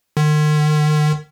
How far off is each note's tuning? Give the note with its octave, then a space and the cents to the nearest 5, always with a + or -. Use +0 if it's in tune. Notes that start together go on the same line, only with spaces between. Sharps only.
D#3 -45